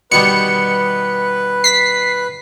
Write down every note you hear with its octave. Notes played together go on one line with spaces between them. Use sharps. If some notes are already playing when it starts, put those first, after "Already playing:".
B2 D#3 G3 B4 C#7
B6 C7